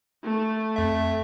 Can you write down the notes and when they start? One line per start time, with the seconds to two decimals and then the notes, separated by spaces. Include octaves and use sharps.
0.24 A3
0.76 F2 E5